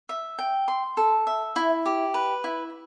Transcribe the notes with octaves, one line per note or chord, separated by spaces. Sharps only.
E5
G5
C6
A4
E5
E4
G4
B4
E4